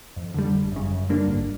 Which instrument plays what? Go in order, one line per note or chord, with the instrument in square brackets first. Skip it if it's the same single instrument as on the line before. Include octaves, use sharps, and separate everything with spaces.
[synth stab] F2
D3 G3
G1
F#2 C#3
F#2
D3 G3 A#3 D4
G#1